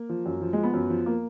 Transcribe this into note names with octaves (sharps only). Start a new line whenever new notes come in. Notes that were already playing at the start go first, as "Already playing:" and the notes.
Already playing: A#3
F3
F#2
F3
F3 G#3
B3
F#2
F3
A#3